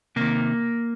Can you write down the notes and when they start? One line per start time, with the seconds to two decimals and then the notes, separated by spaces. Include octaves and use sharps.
0.16 C3 D#3 A#3